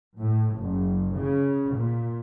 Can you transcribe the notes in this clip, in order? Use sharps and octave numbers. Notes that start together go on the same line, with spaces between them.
A2
F#1
C#3
A#2